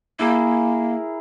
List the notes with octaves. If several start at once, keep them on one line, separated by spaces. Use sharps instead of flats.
A#3 E4 G#4 A#4